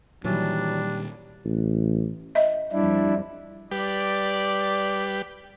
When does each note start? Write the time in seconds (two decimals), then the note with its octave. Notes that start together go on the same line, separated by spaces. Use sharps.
0.24 A#2 D#3 E3 F#3 G3 D4
1.45 A1
2.35 D#5 E5
2.72 F2 G3 D4 E4
3.71 G3 G4 B4 D5